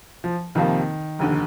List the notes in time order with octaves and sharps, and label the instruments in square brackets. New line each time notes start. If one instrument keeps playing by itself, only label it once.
[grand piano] F3
[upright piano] F2 C3 F3 A#3 [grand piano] D#3
[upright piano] F1 D#2 D3